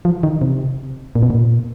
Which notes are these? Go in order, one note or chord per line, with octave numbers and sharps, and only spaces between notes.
F3
D#3
C3
A#2
B2
A#2